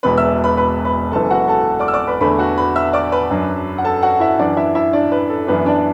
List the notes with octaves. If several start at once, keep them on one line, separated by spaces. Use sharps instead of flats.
E1 E2 B2 B4 B5
E5 E6
B4 B5
B4 B5
B4 B5
F#1 E2 E3 A4 A5
F#4 F#5
A4 A5
D5 D6
E6
D5 D6
B4 B5
E2 D3 A3 D4 B4 B5
F#4 F#5
B4 B5
E5 E6
D5 D6
B4 B5
F#2 F#3 D4
F#5
A4 A5
F#4 F#5
E4 E5
F#2 E3 D4 D5
E4 E5
E4 E5
D4 D5
B4
A4
F#2 E3 B3 D4 B4
D4 D5